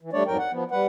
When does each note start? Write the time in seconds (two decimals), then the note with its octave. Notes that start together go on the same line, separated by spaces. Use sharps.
0.01 E3
0.13 G3 A3 D4 C#5 D5
0.27 F2 G#2 F#3 A#4 G5
0.38 F#5
0.52 F3 B3
0.71 G3 B4 F#5